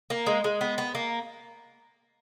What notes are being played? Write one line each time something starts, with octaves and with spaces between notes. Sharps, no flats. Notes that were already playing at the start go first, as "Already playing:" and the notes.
A#3
G#3
G#3
B3
B3
A#3